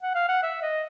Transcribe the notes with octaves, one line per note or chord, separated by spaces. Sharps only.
F#5
F5
F#5
E5
D#5